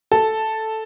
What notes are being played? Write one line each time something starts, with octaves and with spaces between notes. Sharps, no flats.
A4